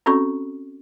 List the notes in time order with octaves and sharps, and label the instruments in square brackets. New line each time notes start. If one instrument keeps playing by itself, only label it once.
[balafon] C4 C#4 F#4 A4 B5 C#6